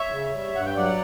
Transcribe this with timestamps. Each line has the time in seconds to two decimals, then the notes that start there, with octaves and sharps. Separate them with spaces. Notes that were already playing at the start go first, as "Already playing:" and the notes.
Already playing: C#5 E5
0.12 C#3
0.33 G3
0.55 G2 F#5
0.66 G5
0.76 F#3 D5 F#5